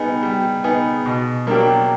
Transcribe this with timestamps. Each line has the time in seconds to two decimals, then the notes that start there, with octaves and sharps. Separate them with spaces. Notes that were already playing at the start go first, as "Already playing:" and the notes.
Already playing: G3 B3 D#4 G#4
0.23 G3
0.64 B3 D#4 G#4
1.06 B2
1.47 F#3 A#3 D4 G4